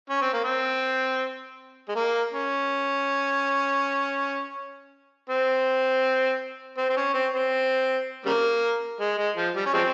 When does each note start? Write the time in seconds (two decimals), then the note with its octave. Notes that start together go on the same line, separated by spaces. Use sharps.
0.10 C#4
0.21 C4
0.33 A#3
0.44 C4
1.88 G#3
1.95 A#3
2.33 C#4
5.29 C4
6.77 C4
6.89 C4
6.96 C#4
7.14 C4
7.33 C4
8.25 C#3 G3 A#3
9.00 G#3
9.18 G#3
9.36 F3
9.55 G3
9.66 C#4
9.74 F3 G#3 C4